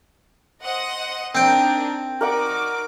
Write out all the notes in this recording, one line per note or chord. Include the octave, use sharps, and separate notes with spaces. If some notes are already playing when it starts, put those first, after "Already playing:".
C5 D#5 F#5
C4 D4 D#4 A#4 G5
D#4 F#4 A#4 D5 F#5 D6